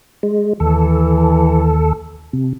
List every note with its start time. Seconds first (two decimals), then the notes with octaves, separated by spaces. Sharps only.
0.23 G#3
0.60 D#2 E3 A4
2.33 C3